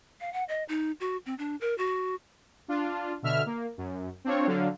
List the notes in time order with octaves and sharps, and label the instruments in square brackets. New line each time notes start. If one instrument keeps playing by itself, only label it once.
[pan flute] F5
F#5
D#5
D#4
F#4
C4
D4
A#4
F#4
[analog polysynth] D4 F4
B2 D3 E5 F6
A#3
F#2
C4 D4 F4 C#5
D3 F#3 F5